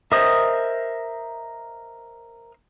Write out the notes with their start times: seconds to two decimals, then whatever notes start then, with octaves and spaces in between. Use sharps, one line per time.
0.12 A#4 C5 D#5 E5 D#6